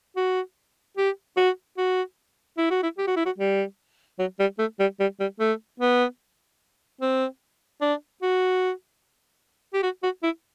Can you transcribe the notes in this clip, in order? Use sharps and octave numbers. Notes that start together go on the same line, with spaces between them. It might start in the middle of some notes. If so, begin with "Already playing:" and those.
F#4
G4
F#4
F#4
E4
F#4
E4
G4
F#4
E4
F#4
G3
F#3
G3
A3
G3
G3
G3
A3
B3
C4
D4
F#4
G4
F#4
F#4
E4